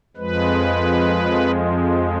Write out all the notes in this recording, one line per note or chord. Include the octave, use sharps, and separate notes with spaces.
F2 F3 G#3 B4